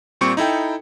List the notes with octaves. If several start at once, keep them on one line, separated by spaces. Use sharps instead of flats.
A#2 G3 C4 C#6 C#7
D#4 E4 A4 G5